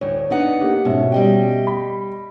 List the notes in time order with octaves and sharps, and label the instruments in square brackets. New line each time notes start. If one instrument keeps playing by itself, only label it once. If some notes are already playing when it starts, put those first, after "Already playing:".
[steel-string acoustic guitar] D2 A2 [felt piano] C#5
[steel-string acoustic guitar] B3 D#4 F#5 [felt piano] D4
[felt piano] A#3 G4
[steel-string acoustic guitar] G#2 [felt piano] B2 C#4 E5
[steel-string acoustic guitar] G3 D#5 G5
[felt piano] B5